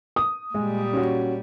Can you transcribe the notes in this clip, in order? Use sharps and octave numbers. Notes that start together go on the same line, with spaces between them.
D#6
A#2 G3 G#3
C#4 F#4